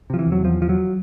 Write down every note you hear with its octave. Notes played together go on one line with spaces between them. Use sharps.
C3 F3
E3
E2
F#3
E2 F3
E2 F3
F#3